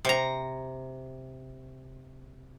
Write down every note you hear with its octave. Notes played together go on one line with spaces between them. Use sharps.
C3 A#5